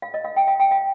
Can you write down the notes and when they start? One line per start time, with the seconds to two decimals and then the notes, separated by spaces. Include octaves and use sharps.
0.02 F5
0.14 D#5
0.24 F5
0.36 G5
0.47 F5
0.60 G5
0.71 F5